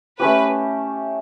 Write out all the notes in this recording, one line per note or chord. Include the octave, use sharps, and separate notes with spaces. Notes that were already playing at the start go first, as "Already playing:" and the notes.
A3 C#4 G4 B4